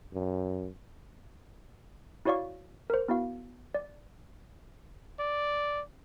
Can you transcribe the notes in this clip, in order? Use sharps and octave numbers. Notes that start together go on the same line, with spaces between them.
F#2
E4 F#4 C#5 D5 F5 C#6
A#4 C5
B3 E4 F#4 F5
D5
D5